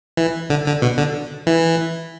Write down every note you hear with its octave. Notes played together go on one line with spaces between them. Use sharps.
E3
D3
D3
B2
D3
E3